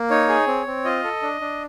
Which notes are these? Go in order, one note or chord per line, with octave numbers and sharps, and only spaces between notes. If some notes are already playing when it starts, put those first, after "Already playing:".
Already playing: A#3
D#4 C#5
G#4
C4
C4
F4 D#5
A4
D4
D4